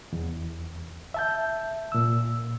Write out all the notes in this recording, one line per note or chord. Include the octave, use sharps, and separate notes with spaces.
E2
E5 A5 G6
A#2 E6